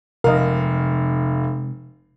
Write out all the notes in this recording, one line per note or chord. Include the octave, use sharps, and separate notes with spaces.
F1 C3 F3 G#3 A#4 D#5 F5